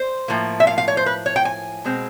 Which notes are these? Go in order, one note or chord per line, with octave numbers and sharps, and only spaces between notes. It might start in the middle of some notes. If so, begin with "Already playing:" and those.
Already playing: C5
A2 F3 A#3
E5
F5
F5
C#5
C5
B4
C#5
G5
G#5
B2 G#3 C4